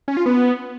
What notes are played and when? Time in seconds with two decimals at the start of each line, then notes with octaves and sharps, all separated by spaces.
0.08 C#4
0.17 F4
0.26 B3